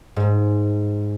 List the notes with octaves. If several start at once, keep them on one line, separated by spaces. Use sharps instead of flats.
G#2